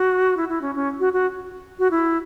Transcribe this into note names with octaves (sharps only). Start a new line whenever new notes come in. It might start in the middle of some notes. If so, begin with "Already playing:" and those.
Already playing: F#4
E4
E4
C#4
C#4
F#4
F#4
F#4
E4